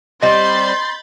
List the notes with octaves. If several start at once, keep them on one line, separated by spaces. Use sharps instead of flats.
G3 C4 D#5 B5 C6 G6 A6